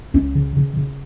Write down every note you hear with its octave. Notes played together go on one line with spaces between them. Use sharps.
C#2 C#4
C#3
C#3
C#3